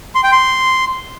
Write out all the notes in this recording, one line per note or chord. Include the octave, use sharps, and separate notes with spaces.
C6
G5
C6